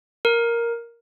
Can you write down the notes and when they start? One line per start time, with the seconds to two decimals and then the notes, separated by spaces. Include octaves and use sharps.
0.25 A#4